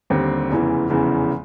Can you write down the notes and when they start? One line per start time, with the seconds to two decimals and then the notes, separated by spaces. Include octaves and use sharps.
0.10 D#2 D3 G3 C4
0.50 F1 E2 C#3 E3
0.90 F1 E2 C#3 E3